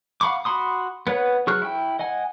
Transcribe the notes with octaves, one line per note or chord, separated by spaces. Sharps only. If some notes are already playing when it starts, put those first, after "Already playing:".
F5 F#5 B5 C#6 D6
F#4 B5 C6 D#6
B3 B4 C#5 F#5
F#3 G#4 C#6 F6 F#6
E4 G5
D#5 F#5 G#5